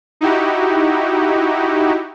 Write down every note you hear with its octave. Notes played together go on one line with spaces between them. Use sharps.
D#4 E4 F#4 G4